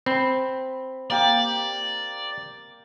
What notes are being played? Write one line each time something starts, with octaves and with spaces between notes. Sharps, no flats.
C4 B5
A#3 G4 D5